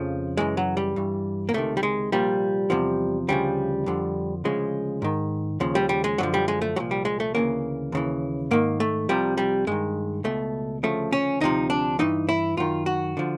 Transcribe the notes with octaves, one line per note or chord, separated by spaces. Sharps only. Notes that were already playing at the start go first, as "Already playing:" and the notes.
Already playing: F2 C#3 F3 A3
F#2 C#3 E3 G#3
F#3
G3
G2 E3
A#3
C#2 C3 D#3 A3
G3
G#3
C2 A#2 F3 G3
E2 C3 F3
D2 C#3 F3 G3
F2 D3 F3
D2 C#3 F3 G#3
G#2 D#3
D#2 C#3 F3
G3
G3
G#3
F#2 D3 F3 F#3
G3
G#3
A3
C2 A#2 F3 F#3
G3
G#3
A3
D2 C#3 E3 A#3
D#2 C#3 E3
G#2 D#3 A#3
A3
C2 C3 F3 G3
G3
G2 D#3 G#3
C#2 B2 A3
D2 C#3 F3 A3
C#4
D2 C3 F3 D#4
D4
G2 E3 D#4
E4
F#2 D#3 F4
F#4
D3 F3